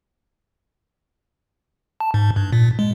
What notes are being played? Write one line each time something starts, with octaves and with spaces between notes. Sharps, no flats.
A5
G#2
G2
A#2
G#3